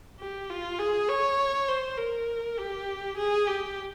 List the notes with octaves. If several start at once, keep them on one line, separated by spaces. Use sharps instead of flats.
G4
F4
G#4
C#5
C5
A#4
G4
G#4
G4